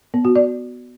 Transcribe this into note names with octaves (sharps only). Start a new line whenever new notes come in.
B3
F#4
D5